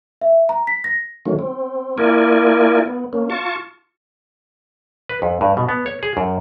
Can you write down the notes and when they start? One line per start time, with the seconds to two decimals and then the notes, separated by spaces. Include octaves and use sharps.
0.21 E5
0.49 A#5
0.67 B6
0.84 A#6
1.26 D#3 F#3 A3 C#4
1.39 C4
1.98 A#3 E4 F4 A#4 D5 G#5
2.86 B3
3.13 A#3 C#4
3.30 F4 A5 C#6
5.09 B4
5.22 F2
5.41 G2
5.57 B2
5.69 B3
5.86 C#5
6.03 G#4
6.17 F#2